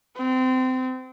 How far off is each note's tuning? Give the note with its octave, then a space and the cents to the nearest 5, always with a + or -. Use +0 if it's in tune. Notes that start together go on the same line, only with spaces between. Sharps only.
C4 -25